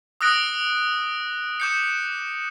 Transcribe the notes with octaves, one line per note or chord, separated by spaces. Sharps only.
D#6 E6 F#6 A#6 D7
D6 G6 C#7